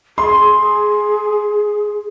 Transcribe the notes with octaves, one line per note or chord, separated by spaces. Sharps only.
G#4 C6